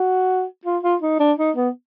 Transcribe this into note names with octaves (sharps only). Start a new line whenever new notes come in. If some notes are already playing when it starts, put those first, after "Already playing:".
Already playing: F#4
F4
F4
D#4
D4
D#4
B3